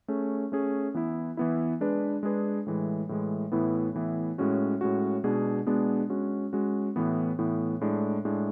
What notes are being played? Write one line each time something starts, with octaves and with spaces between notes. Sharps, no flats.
A3 C#4 G#4
A3 C#4 G#4
E3 B3 E4
E3 B3 E4
G#3 D4 G#4 B4
G#3 D4 G#4 B4
A2 E3 G#3
A2 E3 G#3
A2 E3 B3 E4
A2 E3 B3 E4
A2 G#3 C#4 F#4
A2 G#3 C#4 F#4
B2 G#3 B3 D4 G#4
B2 G#3 B3 D4 G#4
G#3 C#4 F#4
G#3 C#4 F#4
A2 E3 B3
A2 E3 B3
A2 G#3 D4
A2 G#3 D4